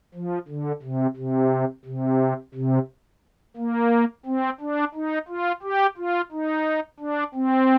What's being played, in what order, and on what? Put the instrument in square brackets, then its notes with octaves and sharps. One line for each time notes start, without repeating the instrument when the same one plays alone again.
[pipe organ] F3
D3
C3
C3
C3
C3
A#3
C4
D4
D#4
F4
G4
F4
D#4
D4
C4